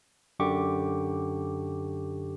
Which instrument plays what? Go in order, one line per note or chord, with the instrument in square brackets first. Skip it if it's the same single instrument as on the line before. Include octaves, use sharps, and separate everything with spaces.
[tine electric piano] F#2 D3 G4 C#6 D6